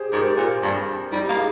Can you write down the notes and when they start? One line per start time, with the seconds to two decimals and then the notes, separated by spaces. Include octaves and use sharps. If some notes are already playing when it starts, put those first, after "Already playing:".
Already playing: G4 G#4 C5
0.12 G#2 G4 A#4
0.37 A#2
0.62 G2
1.12 G3 D#4 G4
1.29 A#3
1.37 G#4